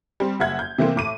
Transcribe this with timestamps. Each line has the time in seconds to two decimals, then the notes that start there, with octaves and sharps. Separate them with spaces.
0.20 G3 C4
0.40 F#1 E5 F#5 G#6
0.59 G6
0.78 C3 E3 A3 A#3 C4
0.96 A2 D6 D#7